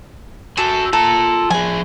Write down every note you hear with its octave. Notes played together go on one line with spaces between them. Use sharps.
F#4 A4 G#5
F4 A4 A#5
F3 G#4 G#5